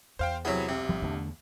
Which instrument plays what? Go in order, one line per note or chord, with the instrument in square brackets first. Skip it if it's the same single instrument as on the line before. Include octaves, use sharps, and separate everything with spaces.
[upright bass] E2 [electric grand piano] C5 F5 G5
[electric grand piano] C3 E4 G#4 [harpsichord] F#3 B3
[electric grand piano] B1 [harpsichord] C3
[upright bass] G#1 [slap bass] F3 G3
[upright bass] E2 [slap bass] D3 A3 D4